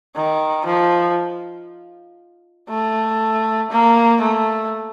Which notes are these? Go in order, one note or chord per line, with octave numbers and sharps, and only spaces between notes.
D#3
F3
A3
A#3
A3